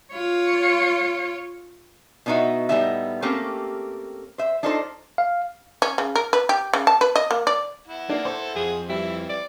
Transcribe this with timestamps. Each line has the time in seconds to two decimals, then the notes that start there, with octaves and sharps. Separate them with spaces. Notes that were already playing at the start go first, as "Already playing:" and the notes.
0.12 F4 C#5
2.26 B2 B3 D#4 E4 F#4 E5
2.69 A2 G3 A3 B3 D#4 E5
3.22 A3 A#3 C4 C#4 G4
4.38 C5 E5
4.63 D4 D#4 F4 A4 B4 C5
5.18 F5
5.82 C#4
5.98 C#3
6.16 A#4
6.33 B4
6.49 G4
6.74 C#3
6.87 A5
7.01 B4
7.16 D#5
7.31 A#3
7.47 D5
7.88 E4 F#5
8.10 A#3 D4
8.25 A4 C5
8.56 F2 G#4
8.89 E3 G3 C4 E4
9.29 D5